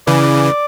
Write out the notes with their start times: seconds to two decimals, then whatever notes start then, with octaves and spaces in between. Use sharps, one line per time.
0.07 C#3 E3 D5